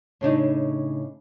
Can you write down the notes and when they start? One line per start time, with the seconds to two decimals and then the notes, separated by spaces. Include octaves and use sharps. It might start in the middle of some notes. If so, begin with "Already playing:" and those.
0.21 A2 C#3 D4 D#4